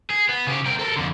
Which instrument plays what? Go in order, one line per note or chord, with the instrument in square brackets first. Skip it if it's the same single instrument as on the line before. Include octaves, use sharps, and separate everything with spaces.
[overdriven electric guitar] G#4
B3
C#3 G4
C4 A#4
A4 A#4
F2 D3